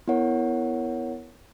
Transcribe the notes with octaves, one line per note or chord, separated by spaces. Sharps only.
B3 E4 A#4 C#5 F#5